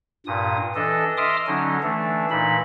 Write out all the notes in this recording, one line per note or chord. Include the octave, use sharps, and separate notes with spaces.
G2 A#2 D#6
E3 D4 A4 D#5
D#5 E5 C6 D6 D#6 F6
D3 F#3 C#4 D#4
E3 A3 D4
A#2 E3 D#4 B5